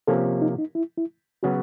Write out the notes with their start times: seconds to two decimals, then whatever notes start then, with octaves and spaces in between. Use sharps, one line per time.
0.07 C3 F3 A#3 C#4 A4
0.42 D#4
0.58 D#4
0.75 E4
0.97 E4
1.43 C#3 F#3 B3 F#4